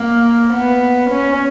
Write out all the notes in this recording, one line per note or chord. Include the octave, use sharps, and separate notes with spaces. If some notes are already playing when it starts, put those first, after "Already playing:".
Already playing: A#3
B3
C#4